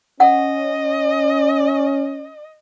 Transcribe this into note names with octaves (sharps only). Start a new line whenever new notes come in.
C#4 D#5 F#5